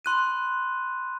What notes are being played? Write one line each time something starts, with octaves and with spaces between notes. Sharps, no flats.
B5 C6 F#6 D#7